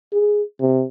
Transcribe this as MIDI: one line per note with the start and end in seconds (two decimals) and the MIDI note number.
0.13 0.42 68
0.60 0.84 48